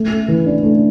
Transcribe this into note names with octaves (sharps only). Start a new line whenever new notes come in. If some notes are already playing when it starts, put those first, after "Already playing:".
Already playing: A3
A3
E3
D4
A3